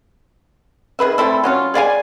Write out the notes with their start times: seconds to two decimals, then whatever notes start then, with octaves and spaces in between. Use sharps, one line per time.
0.99 D#3 G#4 B4 E5
1.18 A3 C4 E4 A4
1.44 F#3 C#4 F4
1.74 G#4 D5 F5 G#5